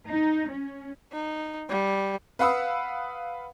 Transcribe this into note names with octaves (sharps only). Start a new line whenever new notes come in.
D#4
C#4
D#4
G3
B4 F5 F#5 B5 D#6 E6